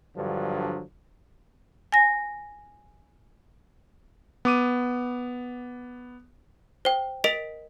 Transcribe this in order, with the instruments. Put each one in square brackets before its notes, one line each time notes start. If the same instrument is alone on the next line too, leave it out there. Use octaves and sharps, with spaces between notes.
[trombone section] G2 D3 F3 F#3
[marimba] G#5 A#6
[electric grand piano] B3 D6 D#7
[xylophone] C5 G5
A#4 D#5 B6 D7 F7